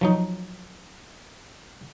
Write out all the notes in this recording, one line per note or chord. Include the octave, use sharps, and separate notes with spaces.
F3 F#3 D#4